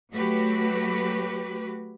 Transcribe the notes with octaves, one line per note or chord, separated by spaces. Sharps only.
F#3 A3 F#4 G4 B4